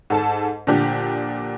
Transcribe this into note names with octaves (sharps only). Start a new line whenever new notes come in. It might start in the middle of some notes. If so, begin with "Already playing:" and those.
G#2 A4 A5
A#2 D3 F3 D4 G4